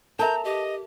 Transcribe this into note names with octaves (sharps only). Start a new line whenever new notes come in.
A4 A#4 E5 A5 A#5 G6
G4 D#5